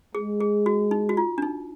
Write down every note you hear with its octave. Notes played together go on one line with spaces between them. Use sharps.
G#3 G#4
G#4
F#4
D#4
F#4
F4
D4
D#4